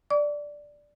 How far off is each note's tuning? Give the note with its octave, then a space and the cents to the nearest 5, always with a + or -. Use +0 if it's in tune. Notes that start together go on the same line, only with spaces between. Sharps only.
D5 +0 D6 -45